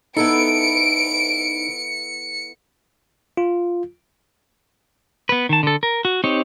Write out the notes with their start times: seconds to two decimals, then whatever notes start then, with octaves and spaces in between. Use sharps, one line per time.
0.17 B3 D#4 E4 A4 C#7 D7
3.37 F4
5.29 B3 B4
5.49 D#3 A5
5.63 D3 A4
5.83 A#4
6.05 F#4
6.24 C4 D#4 G4 C#5